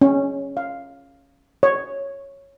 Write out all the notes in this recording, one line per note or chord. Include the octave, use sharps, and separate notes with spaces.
C#4
F5
C#5